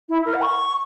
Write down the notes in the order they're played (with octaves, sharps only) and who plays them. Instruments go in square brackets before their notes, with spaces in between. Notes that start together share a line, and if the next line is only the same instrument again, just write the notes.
[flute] E4
A#4
F#5
C#6